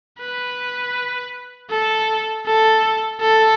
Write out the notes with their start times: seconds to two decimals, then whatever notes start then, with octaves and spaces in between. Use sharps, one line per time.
0.19 B4
1.70 A4
2.46 A4
3.20 A4